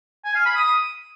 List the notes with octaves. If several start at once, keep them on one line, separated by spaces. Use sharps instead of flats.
G#5
F5
B5
D#6